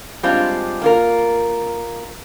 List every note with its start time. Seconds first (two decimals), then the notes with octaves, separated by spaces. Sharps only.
0.23 G3 G#3 C4 D4 F4
0.82 A#3 F4 A#4